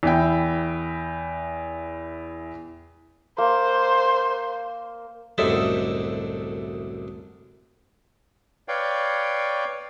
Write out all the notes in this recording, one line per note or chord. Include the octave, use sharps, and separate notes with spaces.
E2 E4 G5
A#3 C5
C2 F#2 A2 D3 D#4 E5
B4 C#5 D5 F5 G5